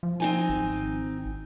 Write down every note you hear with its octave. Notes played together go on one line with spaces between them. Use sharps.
F3
C4 D#4 G#5
G#1